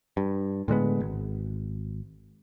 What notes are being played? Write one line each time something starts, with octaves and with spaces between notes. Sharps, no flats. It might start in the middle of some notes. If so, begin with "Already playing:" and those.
G2
A2 D3 G#3 B3
G#1